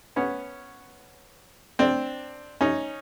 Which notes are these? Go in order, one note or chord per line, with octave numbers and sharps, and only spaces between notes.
B3 C#4
C4 D4
C#4 D#4